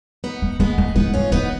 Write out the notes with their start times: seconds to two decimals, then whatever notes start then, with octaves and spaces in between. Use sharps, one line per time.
0.24 B3 D#4
0.42 A#3
0.60 G#3 A#3 B3
0.78 A#3
0.96 G#3 B3 D#4
1.14 G#3 C#4 F4
1.32 A#3 B3 D#4